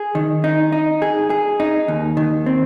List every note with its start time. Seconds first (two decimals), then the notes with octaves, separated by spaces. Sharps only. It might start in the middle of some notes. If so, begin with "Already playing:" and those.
Already playing: G#4
0.15 D#3
0.44 D#4
0.72 D#4
1.02 G#4
1.30 G#4
1.60 D#4
1.88 D#2
2.17 D#3
2.46 C4